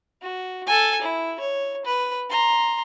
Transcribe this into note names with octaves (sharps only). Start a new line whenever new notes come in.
F#4
A4 G#5
E4
C#5
B4
A#5 C6